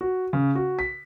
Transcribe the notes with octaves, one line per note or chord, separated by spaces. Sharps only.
F#4
C#3
F#4
B6